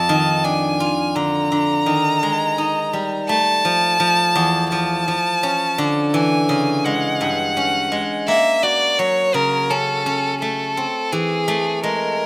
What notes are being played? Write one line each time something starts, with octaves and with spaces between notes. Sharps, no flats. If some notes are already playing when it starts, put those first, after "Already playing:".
Already playing: F2 A5
D#3
D4 G#5
F4
D3 A#5
D3
D#3
G#3
D#4
G3
A3 A5
F3
F3
E2
F3 A5
F3
C#4
D3
E3 G#5
C#3
G#3 F#5
G2
C#4
G#3
A#3 E5
F#4 D5
F#3 C#5
C#3 A#4
C#4 A4
C#4
A3 A4
C4
E3 G#4
A3
G#3 A#4